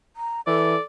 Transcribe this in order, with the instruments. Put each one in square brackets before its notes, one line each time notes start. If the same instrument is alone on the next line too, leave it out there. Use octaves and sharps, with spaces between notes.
[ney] A#5
[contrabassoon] E3 [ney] A4 [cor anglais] D5